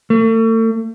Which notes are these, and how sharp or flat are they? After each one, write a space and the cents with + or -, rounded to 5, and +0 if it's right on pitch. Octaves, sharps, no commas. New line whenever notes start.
A3 +40